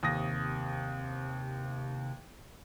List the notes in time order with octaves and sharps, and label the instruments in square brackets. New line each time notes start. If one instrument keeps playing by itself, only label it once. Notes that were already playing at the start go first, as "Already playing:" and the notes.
[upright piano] D#2 D#6 A#6 [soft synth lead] C3